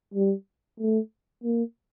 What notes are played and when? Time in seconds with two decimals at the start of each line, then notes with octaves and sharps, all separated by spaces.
0.14 G3
0.80 A3
1.44 A#3